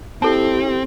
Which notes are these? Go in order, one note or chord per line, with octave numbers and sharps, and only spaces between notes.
C4 E4 G4 A4 A5